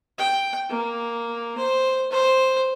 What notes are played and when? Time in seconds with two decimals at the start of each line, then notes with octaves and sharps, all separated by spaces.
0.18 G5
0.69 A#3
1.57 C5
2.11 C5